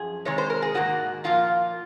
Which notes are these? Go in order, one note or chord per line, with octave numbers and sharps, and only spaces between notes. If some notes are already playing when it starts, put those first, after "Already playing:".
Already playing: F#2 F3 G#4
C3 D#3 G#3 C#5
C5
A#4
G#4
G#2 D#3 A#3 F#4
A#2 F3 A#3 F4